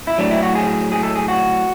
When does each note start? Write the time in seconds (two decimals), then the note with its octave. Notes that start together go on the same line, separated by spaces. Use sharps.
0.07 E4
0.18 A2 F#3 D4
0.31 E4
0.43 F#4
0.55 G#4
0.92 G#4
1.03 A4
1.15 G#4
1.28 F#4